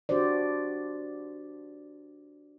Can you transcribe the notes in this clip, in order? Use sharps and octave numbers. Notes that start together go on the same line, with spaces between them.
D4 F#4 G4 C5 D5